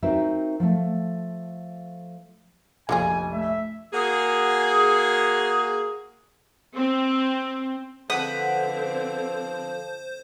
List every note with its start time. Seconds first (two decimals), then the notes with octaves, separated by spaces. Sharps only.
0.02 C4 D#4 F#4 A#4 C5 E5
0.60 F3 A3
2.89 F1 A#1 D3 F3 G#4 G#5
3.33 A3 E5
3.93 A#3 F#4 G#4
6.76 C4
8.10 D3 F3 C4 B4 C5 F#5 D#6